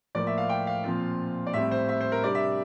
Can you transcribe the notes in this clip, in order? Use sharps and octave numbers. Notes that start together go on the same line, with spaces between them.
A2 F3 A#3 D5
E5
F5
G5
F5
A#2 F3 C4 F4
D5
A2 G3 C4 E5
C5
E5
C5
A#4
C3 G3 D4 D5
E5